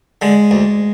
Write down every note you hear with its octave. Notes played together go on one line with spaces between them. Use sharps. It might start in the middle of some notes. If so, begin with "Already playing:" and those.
D3 G#3
D2